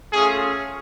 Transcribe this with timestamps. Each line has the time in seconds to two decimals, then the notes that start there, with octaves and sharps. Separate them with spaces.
0.12 A3 C#4 F4 G#4